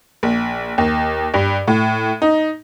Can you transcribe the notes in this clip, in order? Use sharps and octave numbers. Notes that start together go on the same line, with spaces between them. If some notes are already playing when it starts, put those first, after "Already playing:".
A#1
D#2
G2
A2
D#4